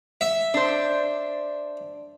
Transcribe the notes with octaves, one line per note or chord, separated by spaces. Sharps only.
E5
D4 C5